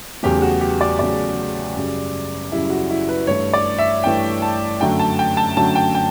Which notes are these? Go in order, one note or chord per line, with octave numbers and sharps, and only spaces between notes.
E2 C#3 F#3 A3 G4
F#4
G4
D5
E2 C#3 F#3 A3 D5
F#2 C#3 G3
F#2 C#3 G3 E4
F#4
E4
B4
G2 E3 A3 C#5
D5
E5
G2 E3 A3 G5
A5
F#2 D3 F#3 A3 G5
A5
G5
A5
F#2 D3 F#3 A3 A5
G5
G5